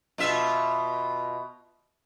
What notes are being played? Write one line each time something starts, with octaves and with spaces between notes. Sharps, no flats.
B2 F4 E5